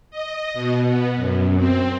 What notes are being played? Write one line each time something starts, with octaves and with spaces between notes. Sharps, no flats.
D#5
B2
B3
F#2
C4